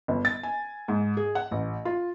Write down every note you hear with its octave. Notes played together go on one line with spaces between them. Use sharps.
G1
A6
G#5
G#2
G#4
F#5
A1
F4